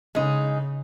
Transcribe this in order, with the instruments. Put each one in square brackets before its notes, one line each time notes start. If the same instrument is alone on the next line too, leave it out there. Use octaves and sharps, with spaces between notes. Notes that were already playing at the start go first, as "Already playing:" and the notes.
[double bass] C#3 [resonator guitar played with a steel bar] G#3 D#4